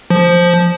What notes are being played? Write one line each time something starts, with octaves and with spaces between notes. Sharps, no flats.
F3